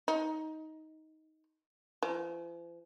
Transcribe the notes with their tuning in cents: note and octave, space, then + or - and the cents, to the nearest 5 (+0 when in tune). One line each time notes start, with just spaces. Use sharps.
D#4 +15
F3 -45